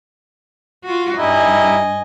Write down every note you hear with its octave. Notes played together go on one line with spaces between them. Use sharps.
F4 F#4
G2 G3 D#4 E4 D#5 G#5